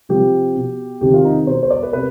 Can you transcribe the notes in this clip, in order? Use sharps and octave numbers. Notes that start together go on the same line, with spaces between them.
C3 F3 G4
B2
C3 D#3 G4
F4
D#4
B2 C5
C5
D5
B4
C3 B4